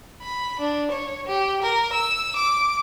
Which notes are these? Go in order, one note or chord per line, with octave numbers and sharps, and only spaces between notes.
B5
D4
C#5
G4
A#4
E6
D6